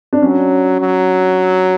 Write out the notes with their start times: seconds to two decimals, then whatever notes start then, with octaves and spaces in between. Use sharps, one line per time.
0.13 D4
0.22 F#3 C#4
0.81 F#3